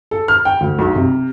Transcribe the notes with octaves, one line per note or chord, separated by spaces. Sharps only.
A4
F6
G5
D2
B1
C3